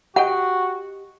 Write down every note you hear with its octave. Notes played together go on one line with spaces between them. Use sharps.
F#4 G4 D#5 F#5 G5